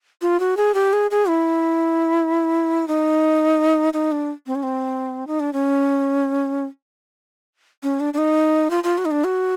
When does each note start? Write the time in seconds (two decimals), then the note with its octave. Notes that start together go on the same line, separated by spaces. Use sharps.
0.22 F4
0.40 F#4
0.57 G#4
0.74 G4
0.93 G#4
1.11 G#4
1.29 E4
2.88 D#4
3.93 D#4
4.12 D4
4.47 C4
4.55 C#4
4.63 C4
5.27 D#4
5.40 D4
5.53 C#4
7.83 C#4
8.00 D4
8.14 D4
8.18 D#4
8.70 F4
8.84 F4
8.98 F#4
9.05 D#4
9.11 D4
9.24 F#4